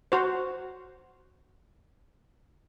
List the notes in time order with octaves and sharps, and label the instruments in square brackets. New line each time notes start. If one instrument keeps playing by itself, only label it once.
[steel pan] F#4 C5